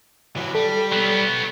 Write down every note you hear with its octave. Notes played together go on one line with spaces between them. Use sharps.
E3 F#3
G3 A4
F#3 B3